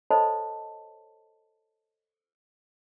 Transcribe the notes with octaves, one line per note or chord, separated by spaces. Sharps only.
A4 C5 C#5 D#5 A5 B5